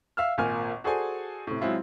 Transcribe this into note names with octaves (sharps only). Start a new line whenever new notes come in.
E5 F5 E6 F6
G#1 A#2 A#3 G#5 F6
F#4 G#4 A4 C5 D5 G#5
A2 C3
F#3 G#3 C4 E4 F4